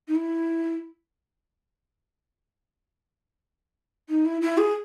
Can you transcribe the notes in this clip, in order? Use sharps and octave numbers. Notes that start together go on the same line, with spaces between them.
D#4
E4
D#4
E4
E4
G#4